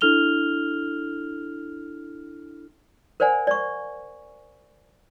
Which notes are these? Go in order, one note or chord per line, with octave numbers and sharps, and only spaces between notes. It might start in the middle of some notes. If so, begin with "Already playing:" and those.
D4 E4 A4 F6 F7 G7
A#4 C5 D5 F#5 G#5
D5 C#6